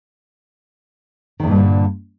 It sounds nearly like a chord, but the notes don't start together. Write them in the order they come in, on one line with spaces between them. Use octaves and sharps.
D#3 E2 A#2 G2 D3